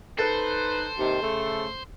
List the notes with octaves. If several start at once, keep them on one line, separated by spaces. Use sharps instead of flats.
D#4 A4 B4 C5
D#2 C3 D#3
C#3 A3